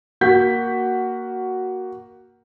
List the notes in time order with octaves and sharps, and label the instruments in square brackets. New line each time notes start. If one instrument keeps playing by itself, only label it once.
[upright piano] A#3 F#4 G6 B6